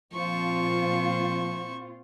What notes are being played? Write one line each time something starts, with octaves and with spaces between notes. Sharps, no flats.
A#2 F3 C4 F4 C5 C#6